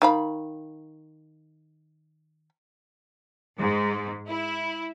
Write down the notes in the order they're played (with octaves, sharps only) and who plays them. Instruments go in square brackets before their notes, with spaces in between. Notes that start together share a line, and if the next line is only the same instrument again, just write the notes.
[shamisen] D#3 F5 B5
[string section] G#2
E4